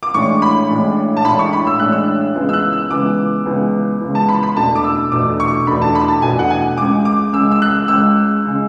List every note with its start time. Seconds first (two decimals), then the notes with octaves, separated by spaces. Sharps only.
0.03 D6
0.14 A1 A2 G#3 D4 C#6
0.42 B5
0.69 A1 A2 G#3 D4
1.17 A5
1.25 A1 A2 G#3 D4 B5
1.39 C#6
1.53 B5
1.67 E6
1.79 A1 A2 G#3 D4 F#6
1.92 E6
2.35 C#2 C#3 E3 G#3 B3
2.49 E6
2.53 F#6
2.73 E6
2.91 C#2 C#3 E3 G#3 B3 D6
3.45 C#2 C#3 E3 G#3 B3
4.01 C#2 C#3 E3 G#3 B3
4.15 A5
4.29 B5
4.43 B5
4.56 E2 B2 A3 D4 A5
4.75 D6
4.84 E6
5.12 E2 B2 A3 D4 D6
5.40 C#6
5.67 E2 B2 A3 D4 B5
5.82 A5
5.95 B5
6.08 A5
6.22 E2 B2 A3 D4 G#5
6.39 F#5
6.50 G#5
6.78 C#2 C#3 G#3 D6
7.05 D6
7.32 C#2 C#3 G#3 E6
7.51 E6
7.62 F#6
7.70 E6
7.88 C#2 C#3 G#3 E6
8.45 C#3 G#3